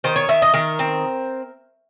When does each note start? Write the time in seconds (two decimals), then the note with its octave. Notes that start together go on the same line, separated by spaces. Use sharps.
0.04 D#3 C5
0.16 C#5
0.29 D#3 E5
0.42 D#5
0.54 D#3 A#4
0.79 C4